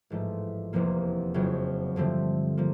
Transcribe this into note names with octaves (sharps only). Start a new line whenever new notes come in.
A1 G#2 F3 A3
F1 E2 C3 F3 A#3
F#1 F2 C#3 F#3
G2 D3 F3 A3 C4
F3 A#3